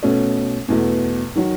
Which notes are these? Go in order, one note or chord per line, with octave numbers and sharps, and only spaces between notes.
B2 A3 C#4
E2 B2 A3
D#3 F#3